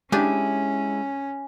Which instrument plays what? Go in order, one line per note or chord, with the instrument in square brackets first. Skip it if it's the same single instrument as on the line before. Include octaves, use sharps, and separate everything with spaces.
[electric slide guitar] G#3 E4 [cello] C#4 [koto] D4 G4 [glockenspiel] G#5